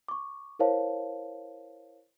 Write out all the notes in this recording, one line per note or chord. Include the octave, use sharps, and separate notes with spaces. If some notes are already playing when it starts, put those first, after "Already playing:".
C#6 D6
E4 A#4 C5 C#5 F5 A5